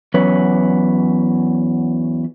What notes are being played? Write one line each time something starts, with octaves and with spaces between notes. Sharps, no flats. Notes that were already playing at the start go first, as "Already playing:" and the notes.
E2 F#3 C#4 B4 C#5